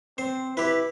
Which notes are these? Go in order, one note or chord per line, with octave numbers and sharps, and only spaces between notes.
C4 C5
E4 G4 B4